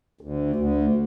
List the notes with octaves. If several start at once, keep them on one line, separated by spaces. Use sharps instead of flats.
D2
D2